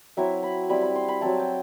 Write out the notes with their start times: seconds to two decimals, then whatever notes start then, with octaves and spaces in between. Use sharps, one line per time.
0.17 F#3 C4 E4 E5
0.43 B5
0.69 G3 C4 E4 B5
0.82 B5
0.96 C6
1.08 B5
1.21 F#3 C4 E4 A5
1.39 G5